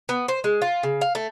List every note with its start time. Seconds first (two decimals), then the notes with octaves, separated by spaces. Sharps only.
0.09 B3
0.28 C5
0.44 G#3
0.62 F4
0.83 C#3
1.01 F5
1.15 A3